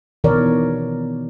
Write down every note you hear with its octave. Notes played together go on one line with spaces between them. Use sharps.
B2 D#3 E3 A#4 C#5 D5